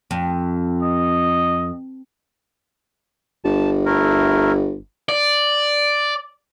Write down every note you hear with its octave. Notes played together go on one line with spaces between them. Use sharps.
F2
D#5
G1 A5
A3 E4 A#4
D5